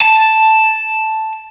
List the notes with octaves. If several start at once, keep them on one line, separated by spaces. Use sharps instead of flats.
A5